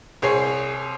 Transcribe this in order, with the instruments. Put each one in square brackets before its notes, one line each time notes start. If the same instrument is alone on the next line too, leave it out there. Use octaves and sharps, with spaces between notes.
[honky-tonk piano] C2 C4 G#4 C#5 C7